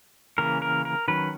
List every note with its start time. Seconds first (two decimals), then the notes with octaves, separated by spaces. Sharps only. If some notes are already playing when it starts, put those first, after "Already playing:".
0.38 C#3 E3 A#3 C#4 A#4
0.62 A#4
0.85 A#4
1.08 D#3 F#3 C#4 B4